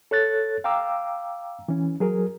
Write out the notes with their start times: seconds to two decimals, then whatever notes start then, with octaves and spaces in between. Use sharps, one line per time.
0.11 A4 C#5 F#6 A6
0.64 F5 G5 A#5 D6 E6
1.69 E3 C#4
2.00 F#3 G#4 A#4